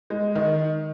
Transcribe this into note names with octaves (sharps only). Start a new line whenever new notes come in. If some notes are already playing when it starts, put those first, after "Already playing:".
G#3
D#3